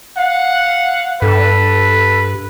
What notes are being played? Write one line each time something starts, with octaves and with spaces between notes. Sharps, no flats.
F5 F#5
G2 A4 B4